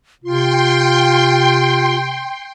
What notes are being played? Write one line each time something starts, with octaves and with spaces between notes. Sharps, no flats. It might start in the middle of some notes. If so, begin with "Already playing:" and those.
C3 F4 G5 C6